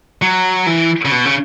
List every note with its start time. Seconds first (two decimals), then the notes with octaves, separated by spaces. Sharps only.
0.22 F#3
0.66 E3
1.05 C#3
1.11 B2
1.25 C#3